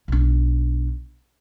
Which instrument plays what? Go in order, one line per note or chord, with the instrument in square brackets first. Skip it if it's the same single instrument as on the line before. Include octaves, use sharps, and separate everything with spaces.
[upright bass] B1 D4